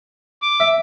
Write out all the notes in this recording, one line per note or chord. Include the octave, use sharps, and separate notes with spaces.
D6
E5